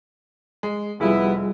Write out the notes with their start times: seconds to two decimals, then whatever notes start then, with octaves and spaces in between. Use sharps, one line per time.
0.63 G#3
1.00 F1 G3 B3 E4 F4 G#4